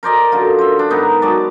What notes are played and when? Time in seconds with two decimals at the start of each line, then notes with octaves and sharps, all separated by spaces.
0.03 A#4 C5 D5 D#5
0.32 F#2 D3 F4
0.59 C5 E5
0.79 D4
0.90 G#2 D#3 B3 D#4
1.22 F#3 G#3 D5 A5